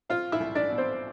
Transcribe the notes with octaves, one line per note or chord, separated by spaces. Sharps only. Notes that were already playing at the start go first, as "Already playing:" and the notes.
C4 F4 F5
E4 E5
C2
D4 D5
B2
C4 C5